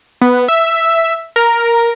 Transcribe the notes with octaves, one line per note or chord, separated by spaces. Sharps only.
B3
E5
A#4